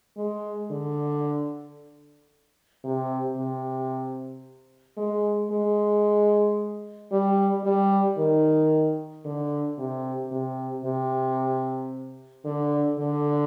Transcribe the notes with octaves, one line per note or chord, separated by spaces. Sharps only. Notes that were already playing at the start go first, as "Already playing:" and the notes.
G#3
D3
C3
C3
G#3
G#3
G3
G3
D#3
D3
C3
C3
C3
D3
D3